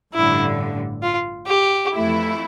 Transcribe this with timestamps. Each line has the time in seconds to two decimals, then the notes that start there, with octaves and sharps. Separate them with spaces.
0.14 A1 G2 D3 E4
1.02 F4
1.47 G4
1.91 F2 E3 A3 E4